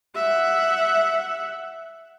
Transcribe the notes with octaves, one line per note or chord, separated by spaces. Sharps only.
E5 F#5